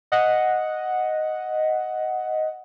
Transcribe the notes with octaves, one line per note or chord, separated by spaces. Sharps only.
D#5 F#5